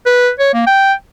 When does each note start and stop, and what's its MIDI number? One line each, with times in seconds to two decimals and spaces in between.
0.06 0.30 71
0.39 0.50 73
0.54 0.64 58
0.67 0.93 79